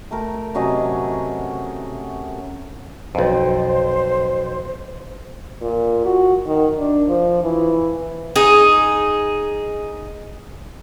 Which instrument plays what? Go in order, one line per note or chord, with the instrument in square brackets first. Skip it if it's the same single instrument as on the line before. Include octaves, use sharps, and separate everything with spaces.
[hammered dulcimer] A3 A4 A#4 G5
C3 F#3 C#4 D#5
[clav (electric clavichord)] B1 F2 [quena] C5
[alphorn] A#2
F#4
D#3
D4
F3
E3
[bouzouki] D#4 G#4